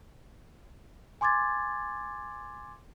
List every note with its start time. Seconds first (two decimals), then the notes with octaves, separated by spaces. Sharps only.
1.21 G#5 C6 D6 G#6 A6